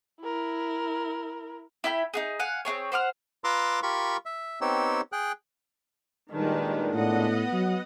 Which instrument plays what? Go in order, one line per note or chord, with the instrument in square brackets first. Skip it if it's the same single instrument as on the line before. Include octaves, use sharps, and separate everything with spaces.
[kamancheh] E4 A#4
[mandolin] E4 E5 G5 B5
D#4 F#4 G#4
F5 F#5 G#5
C4 D4 G#4 C#5
C5 F#5 D6 F6
[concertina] F4 B4 A#5 C6 D6 E6
F4 G4 A#4 B5 C#6
E5
B3 C4 D#4 G4 C#5 E6
G#4 G5 F#6
[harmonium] A#2 G#3 D4 [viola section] D#3 G3 B4
[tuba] A2 [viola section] B3 D#5 F#5
[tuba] F#3